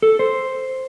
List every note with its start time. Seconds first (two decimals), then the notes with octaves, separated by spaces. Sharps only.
0.02 A4
0.19 C5